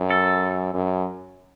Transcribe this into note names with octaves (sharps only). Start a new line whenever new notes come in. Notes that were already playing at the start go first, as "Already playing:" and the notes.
Already playing: F#2
A4
F#2